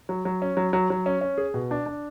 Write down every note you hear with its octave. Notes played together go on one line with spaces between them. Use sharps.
F#3
F#3
C#4
F#3
F#3
F#3
C#4
C#4
G#4
B2
D4
D4